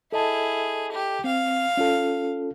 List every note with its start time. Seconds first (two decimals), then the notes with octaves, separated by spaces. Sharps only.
0.12 E4 G#4 A4 D#5 A5
0.91 G4
1.24 C4 F5
1.77 C#4 F4 A4